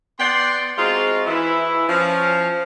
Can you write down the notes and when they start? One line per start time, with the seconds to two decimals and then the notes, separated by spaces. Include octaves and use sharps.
0.19 B3 D5 F#5 G5 C6
0.77 G#3 C4 D#4 F4 F#4
1.25 E3 E4
1.88 F3 C#4